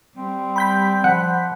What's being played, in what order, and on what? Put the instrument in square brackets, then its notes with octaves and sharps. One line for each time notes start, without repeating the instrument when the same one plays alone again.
[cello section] G3 [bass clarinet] C4
[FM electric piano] B5 G6 B6
[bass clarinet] F3 [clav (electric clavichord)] F#5